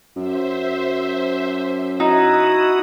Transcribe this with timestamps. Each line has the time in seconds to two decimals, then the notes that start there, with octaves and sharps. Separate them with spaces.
0.16 F#2 C5 E5
2.00 D#4 E4 F#4 D#6